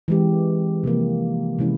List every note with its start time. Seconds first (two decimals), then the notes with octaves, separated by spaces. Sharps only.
0.08 E3 G#3 C4 G4
0.84 C3 F3 A#3
1.59 C3 E3 G#3 C#4 E4